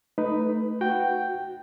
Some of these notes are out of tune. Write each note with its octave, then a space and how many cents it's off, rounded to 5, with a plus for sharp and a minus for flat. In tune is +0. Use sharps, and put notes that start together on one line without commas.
A3 +0 D#4 +0 B4 +10
F#4 +0 G5 +0